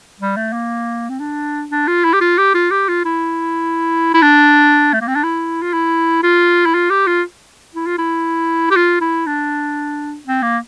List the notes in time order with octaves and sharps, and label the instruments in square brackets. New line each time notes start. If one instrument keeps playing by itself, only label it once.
[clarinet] G3
A3
A#3
C4
D4
D4
F4
E4
G4
F4
G4
F4
G4
F4
E4
E4
D4
A3
A#3
C4
D4
E4
F4
E4
F4
E4
F4
G4
F4
E4
F4
E4
G4
F4
E4
D4
C4
A#3